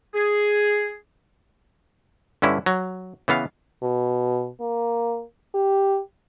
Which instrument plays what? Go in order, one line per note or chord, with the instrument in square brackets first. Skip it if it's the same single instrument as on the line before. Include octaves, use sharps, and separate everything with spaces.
[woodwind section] G#4
[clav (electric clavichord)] G2 D3 C#4 E4
F#3
C#3 E3 B3 F5
[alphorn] B2
A#3
G4